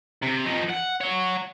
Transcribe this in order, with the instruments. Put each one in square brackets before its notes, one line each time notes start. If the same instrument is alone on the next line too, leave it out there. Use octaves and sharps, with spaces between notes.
[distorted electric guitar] C3
F3 D#4
F#5
C#5 F#5